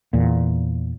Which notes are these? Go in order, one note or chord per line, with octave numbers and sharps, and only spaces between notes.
E2 A#2